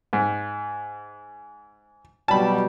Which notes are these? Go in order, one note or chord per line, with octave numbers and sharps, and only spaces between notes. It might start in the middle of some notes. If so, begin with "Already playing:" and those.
G#2
B2 F#3 G3 A5 B5